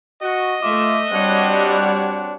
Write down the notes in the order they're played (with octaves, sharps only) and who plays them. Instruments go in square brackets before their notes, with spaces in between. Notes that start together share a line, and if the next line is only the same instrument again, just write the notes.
[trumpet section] F#4 [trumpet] D#5
[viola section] A3 E5 [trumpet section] F4 D6
[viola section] G3 C#5 F#5 [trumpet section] C4 D4 F#4